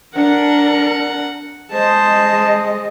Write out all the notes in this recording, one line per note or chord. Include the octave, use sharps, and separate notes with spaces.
D4 A#4 F#5
G#3 C5 D#5 A5